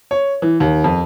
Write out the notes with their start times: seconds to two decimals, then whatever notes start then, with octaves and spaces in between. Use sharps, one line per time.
0.11 C#5
0.42 E3
0.60 D#2
0.84 F2